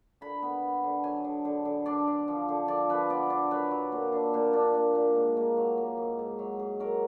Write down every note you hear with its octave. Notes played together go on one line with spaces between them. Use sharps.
D3 B5
B3
B3
D3
F#3 G#5
D3
D3
D3
D4 D5
D4
F3
D3
F3 D5
F3 B4
B3 D5
D4 D5
F#3 B4
F#3
A#2
D4
A#2
D4
A#2
A#2
G#2
A#3
F#3
A#3
G#2
G#2
F#3
G#2
F#3 A#4